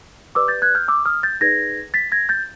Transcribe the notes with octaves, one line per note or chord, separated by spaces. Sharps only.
G4 B4 D5 D6 E6
G6 A6
F#6 G#6
F6 G6
D6 E6
D#6 F6
G6 A6
D#4 G#4 B4 D5 G#6 A#6
A6 B6
G#6 A#6
G6 A6